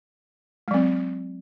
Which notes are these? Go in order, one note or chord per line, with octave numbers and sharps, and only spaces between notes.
F#3 G#3 C4